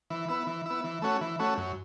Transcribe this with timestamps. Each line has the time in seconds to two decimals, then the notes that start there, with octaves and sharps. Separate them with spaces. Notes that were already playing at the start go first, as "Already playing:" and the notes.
0.10 E3
0.29 B3 E4
0.47 E3
0.66 B3 E4
0.84 E3
1.02 A3 C#4 F#4
1.21 E3
1.39 A3 C#4 F#4
1.58 F#2